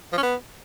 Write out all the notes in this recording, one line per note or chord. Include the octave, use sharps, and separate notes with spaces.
F3
C#4
B3